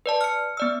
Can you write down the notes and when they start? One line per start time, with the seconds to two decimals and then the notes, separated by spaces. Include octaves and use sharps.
0.06 B4 D5 A5
0.21 F6 C#7
0.57 B3 D5 E6